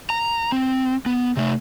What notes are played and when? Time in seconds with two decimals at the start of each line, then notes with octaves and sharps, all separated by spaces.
0.10 A#5
0.52 C4
1.06 B3
1.37 C3 A3